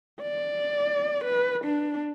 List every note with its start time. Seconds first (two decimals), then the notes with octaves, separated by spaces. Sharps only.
0.22 D5
1.24 B4
1.65 D4